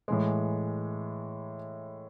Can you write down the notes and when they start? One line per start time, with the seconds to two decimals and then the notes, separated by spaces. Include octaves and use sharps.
0.08 A2 E3 G#3